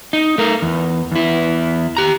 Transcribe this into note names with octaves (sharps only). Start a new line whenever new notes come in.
D#4
A3 A#4
E2
E2 E4
G4 A#5